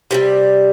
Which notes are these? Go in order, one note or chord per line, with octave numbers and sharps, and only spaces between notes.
C3 D#3 G3